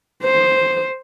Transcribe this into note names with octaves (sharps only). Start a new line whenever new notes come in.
C5